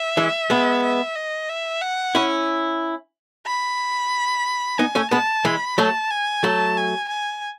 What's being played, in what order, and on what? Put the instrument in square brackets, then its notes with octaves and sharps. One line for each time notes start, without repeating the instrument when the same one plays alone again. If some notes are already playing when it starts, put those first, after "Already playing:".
Already playing: [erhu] E5
[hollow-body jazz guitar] E3 G#3
G#3 B3
[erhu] E5
D#5
E5
F#5
[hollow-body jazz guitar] C#4 E4
[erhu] B5
[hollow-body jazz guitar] B3 D#4 [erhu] G#5
[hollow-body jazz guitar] A3 C#4
[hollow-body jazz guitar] G#3 B3 [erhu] A5
[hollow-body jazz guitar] E3 G#3 [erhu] B5
[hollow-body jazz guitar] F#3 A3 [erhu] A5
[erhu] G#5
[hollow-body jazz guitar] F#3 A3 [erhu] A5
[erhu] G#5
G#5